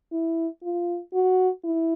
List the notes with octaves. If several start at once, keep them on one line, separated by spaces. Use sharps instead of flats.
E4
F4
F#4
E4